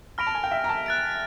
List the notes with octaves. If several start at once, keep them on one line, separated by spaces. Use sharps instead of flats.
B5 F6 A#6 D7 F7
A5
G#5
G5
E5
A#5
A5
F#6 A6 D7